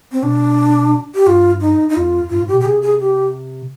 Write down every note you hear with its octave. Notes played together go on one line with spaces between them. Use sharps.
C4
B2 D4
G4
G2 F4
D#4
D#4
F2 F4
G2 F4
G#2
G4
B2
G4
C3 G#4
G#4
G4